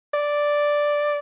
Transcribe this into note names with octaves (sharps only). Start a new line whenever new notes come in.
D5